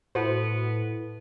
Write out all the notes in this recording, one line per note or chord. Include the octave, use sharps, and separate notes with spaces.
A2 B3 E4 F#4 A4 B4 C5